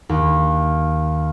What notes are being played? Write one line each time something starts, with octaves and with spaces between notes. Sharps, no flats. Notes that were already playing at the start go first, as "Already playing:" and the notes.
D#2